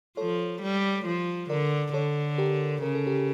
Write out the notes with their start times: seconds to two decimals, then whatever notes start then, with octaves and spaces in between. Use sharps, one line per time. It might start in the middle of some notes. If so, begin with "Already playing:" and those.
0.17 F3 A4 C#5
0.62 G3
1.06 F3
1.50 D3 A#4 D5
1.94 D3 A4 C#5
2.38 G4 A#4
2.82 C#3 A#4
2.95 A4
3.07 G4 A#4